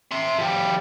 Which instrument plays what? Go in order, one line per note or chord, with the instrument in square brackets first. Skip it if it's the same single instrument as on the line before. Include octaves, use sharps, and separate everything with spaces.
[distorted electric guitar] E5 C6
F3 G3